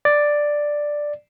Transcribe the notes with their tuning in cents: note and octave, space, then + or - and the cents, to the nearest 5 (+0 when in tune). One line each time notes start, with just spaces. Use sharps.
D5 +5